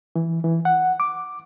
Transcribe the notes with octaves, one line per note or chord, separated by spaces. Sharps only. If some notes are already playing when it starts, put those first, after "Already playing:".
E3
E3
F#5
D6